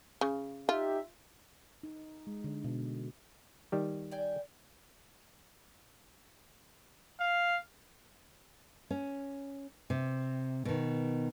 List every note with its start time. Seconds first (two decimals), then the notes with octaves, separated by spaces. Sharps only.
0.21 C#3
0.69 D#4 F4 G4 E5
1.83 D#4
2.27 G#3
2.44 D3
2.64 B2
3.72 D#3 G3 G4
4.11 D5 G5 G#5
7.20 F5
8.90 C#4
9.90 C3
10.65 B2 D#3